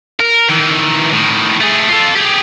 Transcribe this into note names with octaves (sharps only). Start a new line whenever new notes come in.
A#4
D#3 E3
A2 D#3
A3 G#4
F4 A4
G4 G#4